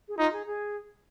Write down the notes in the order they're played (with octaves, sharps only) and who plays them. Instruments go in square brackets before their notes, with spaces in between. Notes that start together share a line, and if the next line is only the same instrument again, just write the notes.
[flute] G#4
[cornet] D#4 [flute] F4
[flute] G#4
G#4